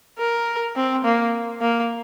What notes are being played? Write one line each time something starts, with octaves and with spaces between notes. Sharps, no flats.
A#4
C4
A#3
A#3